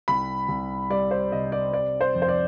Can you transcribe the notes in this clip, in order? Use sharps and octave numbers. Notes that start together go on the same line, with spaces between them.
C2 B5
C2
G3 D5
C5
C3 D#5
D5
C4 D5
C5
F2
C5
D5